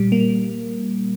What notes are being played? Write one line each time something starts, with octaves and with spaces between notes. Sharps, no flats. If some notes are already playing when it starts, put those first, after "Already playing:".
Already playing: A#2 G3
A#3